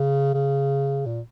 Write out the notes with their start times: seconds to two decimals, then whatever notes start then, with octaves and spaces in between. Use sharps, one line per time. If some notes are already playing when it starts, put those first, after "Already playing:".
Already playing: C#3
0.34 C#3
1.06 A#2